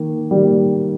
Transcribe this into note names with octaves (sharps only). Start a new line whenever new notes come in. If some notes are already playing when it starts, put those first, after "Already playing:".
Already playing: D#3 A#3
D#3 G3 A#3